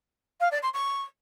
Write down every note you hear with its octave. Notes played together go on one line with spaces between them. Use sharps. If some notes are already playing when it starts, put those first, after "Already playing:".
F5
D5
C6
C#6